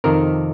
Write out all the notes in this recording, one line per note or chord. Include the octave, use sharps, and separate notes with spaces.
F2 C3 D#3 A#4